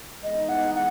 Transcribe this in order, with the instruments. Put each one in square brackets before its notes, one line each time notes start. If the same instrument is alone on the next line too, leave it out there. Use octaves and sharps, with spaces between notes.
[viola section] E3 G#3 B3 D#4 [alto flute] D#5
[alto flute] F#5
F#5